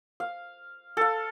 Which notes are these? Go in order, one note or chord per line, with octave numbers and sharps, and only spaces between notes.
F5
A4 F5